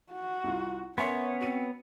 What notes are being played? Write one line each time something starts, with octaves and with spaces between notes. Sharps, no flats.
F#4
C2 F4
B3 C#4 A#4 C#5 E5 G#5 C6
C4 F#4 D#7